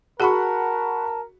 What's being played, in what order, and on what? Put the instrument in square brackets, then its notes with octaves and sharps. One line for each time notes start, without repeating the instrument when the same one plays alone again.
[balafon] F#4 G#4 [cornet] A#4 [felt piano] F#5 B5 C#6 [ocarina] A5